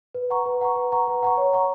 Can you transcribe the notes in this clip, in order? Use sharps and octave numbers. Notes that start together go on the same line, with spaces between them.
B4
F#5 A#5 C#6
B4
F#5 A#5 C#6
B4
F#5 A#5 C#6
B4
F#5 A#5 C#6
C#5
F#5 A#5 C#6